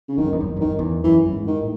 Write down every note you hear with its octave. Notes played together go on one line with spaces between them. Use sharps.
C#3
E2 D#3
F#2
E2
F#2
E2
F#2
E2 D#3
F#2
E2
F#2 E3
F#2
G#2
D#3
A2